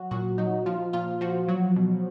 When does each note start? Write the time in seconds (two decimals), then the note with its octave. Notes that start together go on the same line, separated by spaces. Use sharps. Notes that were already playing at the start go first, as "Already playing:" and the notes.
Already playing: F#3 F#4
0.11 A#2 F#4
0.38 F#3 D#4
0.66 F3 F4
0.93 A#2 F4
1.21 F3 F#4
1.48 F#3 F#4
1.76 B2